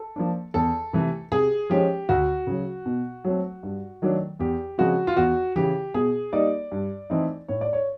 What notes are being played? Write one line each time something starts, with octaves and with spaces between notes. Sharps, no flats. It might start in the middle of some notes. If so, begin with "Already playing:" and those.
Already playing: A4
F3 A#3 D4
E2 A4
C3 E3 A3
C3 G#4
F3 G#3 C#4 G4
D2 F#4
C#3 F#3
B2
F#3 A3 C4
G2
D#3 F#3 A3 D4
E2 G4
C#3 F3 G#3 C4 F#4
F4
E2 F#4
C#3 E3 G4
B2 G#4
G3 A#3 D#4 D5
G2
E3 A3 C4 D#4
A2 C#5
D5
C#5